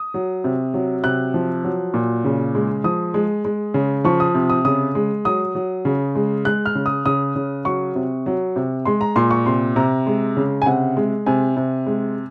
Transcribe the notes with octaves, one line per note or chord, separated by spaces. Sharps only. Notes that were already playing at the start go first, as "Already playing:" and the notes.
Already playing: D#6
F#3
C3
F#3
C3 F#6
F3
F#3
A#2
C#3
G#3
F3 D#6
G#3
G#3
C#3
F3 C#6
D#6
C3
D#6
C#3 D#6
G#3
F#3 D#6
F#3
C#3
G#3
G#3 F#6
F6
C#3
D#6
C#3 D#6
C#3
F#3 C#6
C3
F#3
C3
G#3 C6
A#5
A#2 C6
C#6
C3 C6
C3 A#5
G#3
C#3
G#5
C3 F#5
G#3
C3 G#5
C3
G#3